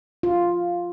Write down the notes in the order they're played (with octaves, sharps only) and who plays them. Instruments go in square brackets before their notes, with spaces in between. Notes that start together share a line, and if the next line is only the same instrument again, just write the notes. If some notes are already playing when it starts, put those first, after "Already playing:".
[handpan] F4